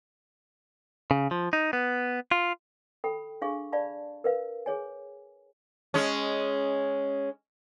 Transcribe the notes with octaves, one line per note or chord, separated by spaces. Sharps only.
C#3
F3
D#4
B3
F4
A4 G5 B5
D4 G#4 F5 G#5 C#6
D5 F5 A5 B5
A#4 B4 F5
G#4 C#5 G#5
G#3 C#4